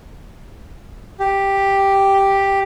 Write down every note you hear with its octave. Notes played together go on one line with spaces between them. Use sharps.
G4